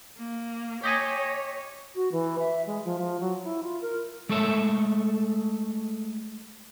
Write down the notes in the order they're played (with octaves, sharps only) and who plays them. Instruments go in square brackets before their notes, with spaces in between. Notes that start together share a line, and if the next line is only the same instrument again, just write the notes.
[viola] A#3
[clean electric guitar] G4 D#5 G#5 [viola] C#5
[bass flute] F#4
E3
E5
G#3
F3
F3
F#3
E4
F4
A#4
[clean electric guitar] G#3 A3 A4 C#5 E5